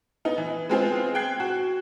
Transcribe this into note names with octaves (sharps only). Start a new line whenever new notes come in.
B3 D#4
E3
G#3 B3 C4 F4 G#4
G5 F#6 G#6 C7
F#4